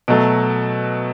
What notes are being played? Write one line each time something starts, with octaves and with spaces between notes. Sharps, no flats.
B2 F#3 A3